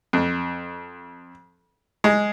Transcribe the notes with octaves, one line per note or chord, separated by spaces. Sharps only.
F2
G#3